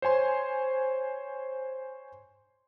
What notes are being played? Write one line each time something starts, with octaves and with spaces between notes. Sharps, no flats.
C5 C#5 G#5 C6